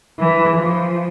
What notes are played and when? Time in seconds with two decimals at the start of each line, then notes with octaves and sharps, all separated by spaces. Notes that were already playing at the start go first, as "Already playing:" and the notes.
0.19 E3
0.58 F3